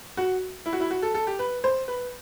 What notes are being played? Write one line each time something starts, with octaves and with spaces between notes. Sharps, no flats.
F#4
E4
F#4
E4
F#4
A4
A4
G4
B4
C5
B4